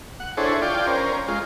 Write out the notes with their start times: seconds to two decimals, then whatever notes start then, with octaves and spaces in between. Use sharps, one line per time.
0.20 F#5
0.37 D4 E4 G#4 A4 C5 C#5
0.62 F4 D5 G5
0.87 C#4 A#4 C5
1.28 G#3 F4